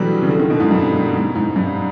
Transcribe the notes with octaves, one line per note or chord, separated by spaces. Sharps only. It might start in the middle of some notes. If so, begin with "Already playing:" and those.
Already playing: B2 D3 E3 F#3 G3
C#3
D3
D#3
B2
G#2
G2
G#2
G#2
G2